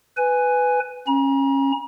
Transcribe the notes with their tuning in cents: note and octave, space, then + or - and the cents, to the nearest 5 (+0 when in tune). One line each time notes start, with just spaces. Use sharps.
B4 +10 G#5 +0
C#4 -25 A#5 +40